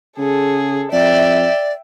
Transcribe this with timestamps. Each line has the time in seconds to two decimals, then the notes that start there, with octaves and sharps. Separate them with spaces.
0.18 C#3 G#4 A4
0.92 F2 D5 E5 G5